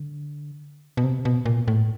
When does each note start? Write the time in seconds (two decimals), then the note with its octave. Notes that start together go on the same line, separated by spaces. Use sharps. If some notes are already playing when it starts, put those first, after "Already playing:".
Already playing: D3
0.97 B2
1.04 C3
1.25 B2
1.46 A#2
1.68 A2